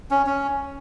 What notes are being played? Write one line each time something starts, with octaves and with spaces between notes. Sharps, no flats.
C#4
C#4